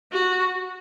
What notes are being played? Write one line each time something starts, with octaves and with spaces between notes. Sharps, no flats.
F#4